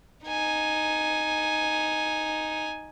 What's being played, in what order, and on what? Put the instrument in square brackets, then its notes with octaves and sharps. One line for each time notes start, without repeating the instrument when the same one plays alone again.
[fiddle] D#4 G#5